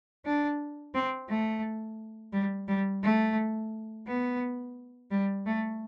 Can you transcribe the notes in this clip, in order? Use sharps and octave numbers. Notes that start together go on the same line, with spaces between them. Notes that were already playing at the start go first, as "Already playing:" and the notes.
D4
C4
A3
G3
G3
A3
B3
G3
A3